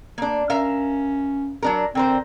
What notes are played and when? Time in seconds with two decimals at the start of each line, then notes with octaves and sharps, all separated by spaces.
0.18 A#3 D4
0.50 C#4 A#4 E5 F5
1.63 F#3 D4 A#4
1.95 D3 C4 A#4 C5